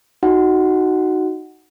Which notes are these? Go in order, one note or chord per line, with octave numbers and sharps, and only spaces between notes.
D#4 F#4 F#5